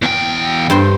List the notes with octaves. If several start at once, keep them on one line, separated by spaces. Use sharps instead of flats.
E2 G5
G2 C5 C6